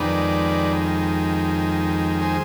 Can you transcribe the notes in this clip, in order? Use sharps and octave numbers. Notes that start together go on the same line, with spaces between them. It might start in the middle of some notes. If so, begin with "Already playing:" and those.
Already playing: F2 D#3 G#3 B4 D5
G#4 C5